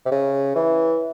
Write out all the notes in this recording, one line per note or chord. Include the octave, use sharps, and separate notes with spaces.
C3
C#3
E3